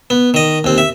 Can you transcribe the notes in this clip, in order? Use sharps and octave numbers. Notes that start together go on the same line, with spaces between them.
B3
D#3 D#5
D#2 C4
E5